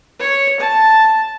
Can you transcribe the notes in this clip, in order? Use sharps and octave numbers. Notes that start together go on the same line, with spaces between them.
C#5
A5